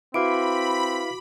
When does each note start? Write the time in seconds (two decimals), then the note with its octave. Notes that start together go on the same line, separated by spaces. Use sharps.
0.14 C4 E4 F#4 B4 F5 B5 D6 D7